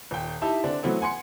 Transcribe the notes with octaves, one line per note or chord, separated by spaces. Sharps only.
D#1 G5
D#4 E4 G4 E5 A5
D3 C4 D4
E3 F#3 A3 B3 C4
F#5 G#5 C6 C#7